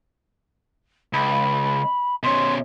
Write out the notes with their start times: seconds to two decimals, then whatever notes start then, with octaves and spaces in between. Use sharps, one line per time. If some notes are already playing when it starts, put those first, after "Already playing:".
1.13 C#2 B5
2.23 B2 C#4 C6